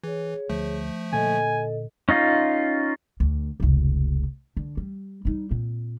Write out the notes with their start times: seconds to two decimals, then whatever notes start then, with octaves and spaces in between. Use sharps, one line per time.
0.03 E3 G#4 C#5
0.50 D2 F3 A3
1.13 A#2 D3 A#3 A4 D#5 G#5
2.09 C#4 D#4 F4
3.20 D2
3.60 F1 C#2
4.57 D3
4.77 G3
5.25 G3 D#4
5.51 A#2 C4